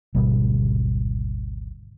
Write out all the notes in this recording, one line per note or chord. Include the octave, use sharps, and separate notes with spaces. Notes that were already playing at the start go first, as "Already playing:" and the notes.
G#1 D2 B2 G3